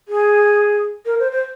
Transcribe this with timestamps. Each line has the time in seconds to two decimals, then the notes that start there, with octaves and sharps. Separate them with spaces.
0.08 G#4
1.06 A#4
1.20 C5
1.32 C5